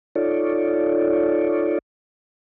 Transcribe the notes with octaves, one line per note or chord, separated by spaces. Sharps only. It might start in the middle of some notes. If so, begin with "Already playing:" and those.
D#4 F4 A4 C#5 D5